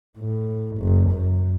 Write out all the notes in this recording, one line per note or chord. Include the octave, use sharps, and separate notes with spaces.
A2
F#1
F#2